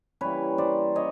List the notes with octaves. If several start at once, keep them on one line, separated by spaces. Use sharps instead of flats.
C#3 E3 G3 A#3 B4 C#5
C5 D5
C#3 C#5 D#5